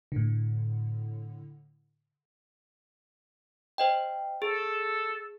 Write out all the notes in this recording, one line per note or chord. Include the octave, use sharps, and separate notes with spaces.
A2 D3
C5 D#5 G5
G#4 A4